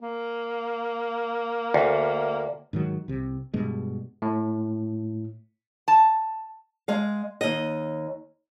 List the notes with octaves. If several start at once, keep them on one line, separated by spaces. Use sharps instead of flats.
A#3
D2
G#2 D#3 F#3
C2 C3
G2 B2 G#3
A2
A5
G#3 F5
D#2 D#5